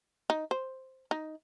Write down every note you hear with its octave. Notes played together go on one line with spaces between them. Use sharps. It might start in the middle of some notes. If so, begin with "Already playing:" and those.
D#4
C5
D#4